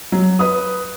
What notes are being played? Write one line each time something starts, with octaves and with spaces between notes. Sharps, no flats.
F#3
B4 D#6